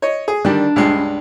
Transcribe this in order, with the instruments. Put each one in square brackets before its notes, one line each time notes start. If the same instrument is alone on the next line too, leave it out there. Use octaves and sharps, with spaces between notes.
[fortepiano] C#5 D#5
G#4
[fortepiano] D3 D#3 G3 [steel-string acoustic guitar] D4
[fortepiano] C#2 G2 G#3